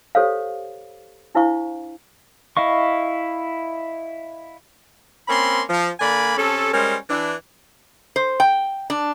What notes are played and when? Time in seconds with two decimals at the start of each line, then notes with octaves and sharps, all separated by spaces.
0.15 G4 A4 C5 C#5 F5
1.35 D4 E4 C5 F5 C#6
2.57 E4 D#5 F5 C#6
5.28 A#3 C4 C#4 B5 C6
5.69 F3
6.00 D3 A#3 D5 G#5 B5
6.37 C3 C#4 A4
6.73 G3 G#3 C#4 A#4 C5
7.09 E3 D4
8.16 C5
8.40 G5
8.90 D4